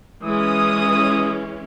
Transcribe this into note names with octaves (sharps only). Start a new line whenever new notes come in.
E3 G#3 C#4 D#6